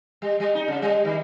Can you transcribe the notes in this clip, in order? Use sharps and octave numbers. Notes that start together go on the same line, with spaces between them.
G3
G3
D#4
C#3
G3
D#3